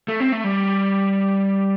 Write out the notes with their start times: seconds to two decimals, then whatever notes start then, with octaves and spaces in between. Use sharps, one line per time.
0.08 A3
0.20 C4
0.32 A3
0.44 G3